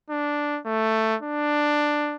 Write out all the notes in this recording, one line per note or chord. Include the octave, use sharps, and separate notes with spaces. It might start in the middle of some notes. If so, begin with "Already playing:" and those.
D4
A3
D4